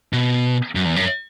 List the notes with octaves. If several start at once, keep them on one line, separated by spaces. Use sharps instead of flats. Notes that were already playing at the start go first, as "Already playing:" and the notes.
B2
F#2
E2
F#2